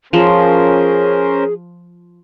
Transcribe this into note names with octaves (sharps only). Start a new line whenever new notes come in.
F3 C#4 G#4 A#4 C5